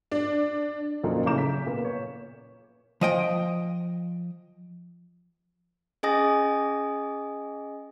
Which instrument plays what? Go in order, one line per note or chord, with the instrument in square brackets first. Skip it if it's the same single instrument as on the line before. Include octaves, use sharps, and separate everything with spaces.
[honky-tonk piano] D4
[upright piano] F2 A#2 F3 F#3 C#4 D#4
A2 C#3 A#5 D6 G6 E7
B6
A#2 B3
C#5
[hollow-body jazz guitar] F3 D#5 G5
[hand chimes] C#4 G#4 D#5 G#5 D#6 A#6